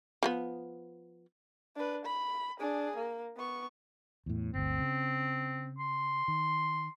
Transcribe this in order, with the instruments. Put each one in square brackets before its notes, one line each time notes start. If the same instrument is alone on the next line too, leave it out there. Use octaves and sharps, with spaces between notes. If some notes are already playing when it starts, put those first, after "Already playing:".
[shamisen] F3 A#3 B3
[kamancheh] D4 B4
B5
D4 G#4
A#3
B3 C#6
[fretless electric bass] E2 A2
[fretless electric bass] G1 D2 [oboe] C4
[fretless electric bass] C#3
[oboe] C6
[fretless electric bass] D#3